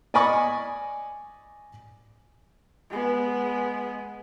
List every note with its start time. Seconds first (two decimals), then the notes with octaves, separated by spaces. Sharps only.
0.14 D5 D#5 G#5 B5 C#6 D#6
2.90 G#3 B3